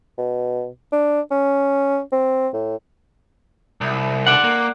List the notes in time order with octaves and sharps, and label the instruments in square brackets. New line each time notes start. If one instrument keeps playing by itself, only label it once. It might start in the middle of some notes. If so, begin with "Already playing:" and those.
[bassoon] B2
D4
C#4
C4
A2
[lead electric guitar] C2
[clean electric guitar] D5 F#5
[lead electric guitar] A#3